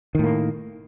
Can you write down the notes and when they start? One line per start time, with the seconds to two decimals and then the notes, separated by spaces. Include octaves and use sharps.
0.15 D#3
0.19 A2
0.24 A#3